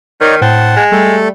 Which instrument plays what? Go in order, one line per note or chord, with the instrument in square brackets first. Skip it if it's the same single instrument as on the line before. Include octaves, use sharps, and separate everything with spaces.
[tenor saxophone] D#3 [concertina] D#4 C#5 D5 [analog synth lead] A#4
[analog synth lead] A2 [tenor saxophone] C4 [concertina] F#5 A5
[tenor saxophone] G#3
[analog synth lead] G3 [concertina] A3 A4